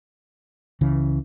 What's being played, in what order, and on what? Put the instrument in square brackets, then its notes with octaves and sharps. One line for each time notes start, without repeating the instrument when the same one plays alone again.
[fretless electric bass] C#2 C#3 E3